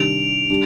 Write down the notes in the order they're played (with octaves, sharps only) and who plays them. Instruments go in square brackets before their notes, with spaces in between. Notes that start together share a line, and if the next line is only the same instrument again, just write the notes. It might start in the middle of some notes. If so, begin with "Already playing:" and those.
Already playing: [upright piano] C3 D#3 G3 D4 [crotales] D7 F7
[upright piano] G3 D4